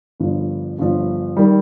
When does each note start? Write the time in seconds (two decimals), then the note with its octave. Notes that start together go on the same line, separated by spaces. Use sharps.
0.20 G1 G2 F3
0.79 G1 G2 F3
1.37 D#3 G3